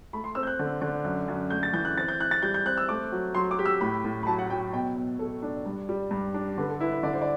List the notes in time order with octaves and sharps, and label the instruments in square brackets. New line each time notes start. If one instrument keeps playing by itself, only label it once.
[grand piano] A3 [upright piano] B5
[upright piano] C6
[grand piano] C4 [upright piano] E6
[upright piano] G6
F#6
[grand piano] D3
D3
F#2
F#2
[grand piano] A3 [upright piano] G6
[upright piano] A6
[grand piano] E3 [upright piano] G6
[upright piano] F#6
[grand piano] C4 [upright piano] A6
[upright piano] G6
[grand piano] E4 [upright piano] F#6
[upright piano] A6
[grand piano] G3 [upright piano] G6
[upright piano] G6
[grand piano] C4 [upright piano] F#6
[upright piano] E6
[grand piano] A3 [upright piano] D6
[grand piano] F#3
[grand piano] F#3 [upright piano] C6
[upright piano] D6
[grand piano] G4
[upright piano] E6
[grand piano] A2 [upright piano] B5
[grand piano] A2
[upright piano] B5
[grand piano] F#3 [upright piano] A5
[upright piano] F#5
[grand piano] F#3 [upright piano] G5
[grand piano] B2 [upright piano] G5
[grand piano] B2
[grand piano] B2 [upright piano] A4
[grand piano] D4
G2
G3
G2
D4
[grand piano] D3 [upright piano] B4
[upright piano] A4
[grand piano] E4 [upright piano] B4
[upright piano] B4
[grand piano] D3 [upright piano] D5
[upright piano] C5
D5